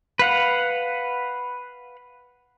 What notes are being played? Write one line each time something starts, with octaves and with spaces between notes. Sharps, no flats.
B4 F5 F#5